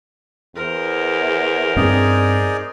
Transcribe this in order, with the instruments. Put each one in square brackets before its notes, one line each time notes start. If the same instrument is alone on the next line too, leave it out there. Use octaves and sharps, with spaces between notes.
[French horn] E2 [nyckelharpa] A#4 C5
[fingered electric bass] G2 C4 [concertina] D#4 G#4 D5